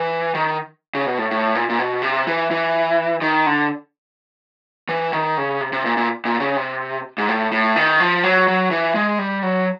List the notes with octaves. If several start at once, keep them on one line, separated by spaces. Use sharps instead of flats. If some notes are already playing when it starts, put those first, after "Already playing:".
Already playing: E3
D#3
C#3
B2
A2
A2
A#2
A#2
B2
C3
E3
E3
D#3
D3
E3
D#3
C#3
C3
C3
A#2
A#2
A#2
C#3
C3
G#2
A2
A2
D#3
F3
F#3
F#3
E3
G#3
G3
F#3